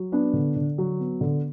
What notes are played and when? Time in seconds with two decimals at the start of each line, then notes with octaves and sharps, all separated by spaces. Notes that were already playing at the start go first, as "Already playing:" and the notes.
Already playing: F#3
0.12 B3 D4
0.33 D3
0.56 D3
0.78 F#3
1.00 B3
1.21 D3